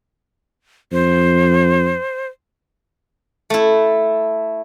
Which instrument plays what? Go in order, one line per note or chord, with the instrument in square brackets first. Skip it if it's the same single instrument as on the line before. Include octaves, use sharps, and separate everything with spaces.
[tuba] F2 [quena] C5
[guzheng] A3 E4